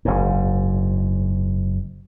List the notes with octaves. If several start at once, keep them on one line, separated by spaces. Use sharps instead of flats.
F#1 G#2